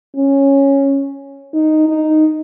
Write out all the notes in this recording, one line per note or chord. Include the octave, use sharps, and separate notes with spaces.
C#4
D#4
D#4